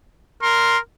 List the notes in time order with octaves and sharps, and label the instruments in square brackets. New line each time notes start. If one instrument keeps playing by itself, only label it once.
[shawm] A#4 [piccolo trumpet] C6